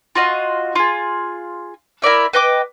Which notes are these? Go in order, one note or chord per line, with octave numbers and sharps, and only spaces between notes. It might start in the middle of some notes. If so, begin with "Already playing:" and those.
F4 F#4 D#5 F5
F4 G#4
E4 A#4 D5 E5
B4 D#5 G5 D6